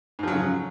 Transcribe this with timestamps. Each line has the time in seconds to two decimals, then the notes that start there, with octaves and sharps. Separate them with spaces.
0.19 G#2
0.23 F3
0.28 F#3
0.32 C#3